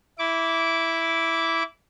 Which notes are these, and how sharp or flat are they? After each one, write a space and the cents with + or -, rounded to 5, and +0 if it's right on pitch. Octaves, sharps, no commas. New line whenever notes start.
E4 +0 D6 -20